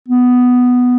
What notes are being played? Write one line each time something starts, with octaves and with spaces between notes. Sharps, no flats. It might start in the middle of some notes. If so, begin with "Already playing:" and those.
B3